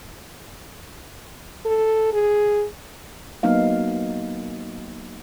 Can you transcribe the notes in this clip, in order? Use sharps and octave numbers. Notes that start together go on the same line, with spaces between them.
A4
G#4
F#3 A#3 B3 D#4 F5